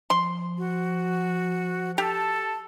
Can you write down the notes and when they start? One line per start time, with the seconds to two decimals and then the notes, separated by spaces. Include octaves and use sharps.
0.10 F3 C6
0.58 F#4
1.98 G4 A4 A5